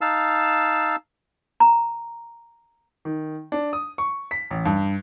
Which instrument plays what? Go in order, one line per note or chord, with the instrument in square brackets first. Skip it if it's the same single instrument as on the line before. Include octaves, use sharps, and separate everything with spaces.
[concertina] D#4 F5 A5 E6
[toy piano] A#5
[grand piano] D#3
D4
D#6
C#6
B6
A1
G2